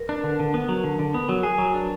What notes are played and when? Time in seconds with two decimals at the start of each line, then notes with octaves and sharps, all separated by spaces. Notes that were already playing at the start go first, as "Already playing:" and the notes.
Already playing: A#4 B4
0.09 D4
0.24 D3
0.40 D3
0.54 B3
0.69 F#3
0.84 D3
0.99 D3
1.14 B3
1.29 F#3
1.43 G#4
1.58 F#3
1.74 D4